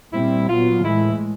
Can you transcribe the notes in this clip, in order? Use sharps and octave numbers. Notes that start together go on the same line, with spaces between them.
A#2 G3 C4 E4
A#2 F#3 B3 F4
A2 E3 G#3 E4